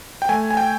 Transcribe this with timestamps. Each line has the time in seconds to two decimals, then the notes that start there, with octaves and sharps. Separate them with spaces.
0.22 G5
0.29 A3 G#5
0.51 G#5
0.57 G5